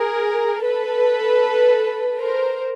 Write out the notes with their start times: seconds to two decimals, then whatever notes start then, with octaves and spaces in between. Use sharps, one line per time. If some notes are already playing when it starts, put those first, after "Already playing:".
Already playing: G#4 A#4
0.62 A4 B4
2.19 A#4 C5